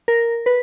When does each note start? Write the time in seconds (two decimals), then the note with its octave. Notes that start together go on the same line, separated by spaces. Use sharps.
0.08 A#4
0.46 B4